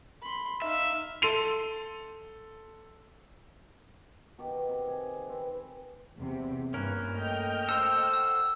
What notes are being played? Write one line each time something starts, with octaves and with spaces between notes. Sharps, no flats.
B5 C6
D#4 E5 F5
A4 C6 D#7 F7
B2 D#3 G4
C3
G#4
C4 B4
E2 C3 C4
G2 E3 A#3 C#4 A#4 F#6
A3 D#5 G5 F6
A4 C5 F5 E6
F#5 E6